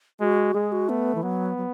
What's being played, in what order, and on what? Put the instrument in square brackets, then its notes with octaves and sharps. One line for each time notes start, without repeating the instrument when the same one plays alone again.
[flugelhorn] G#3 [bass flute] F#4
[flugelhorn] G#3 [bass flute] G#4
[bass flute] F#4
[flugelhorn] A3 [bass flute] B3
[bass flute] E3
[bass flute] F#3 [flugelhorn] B3
[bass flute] F#3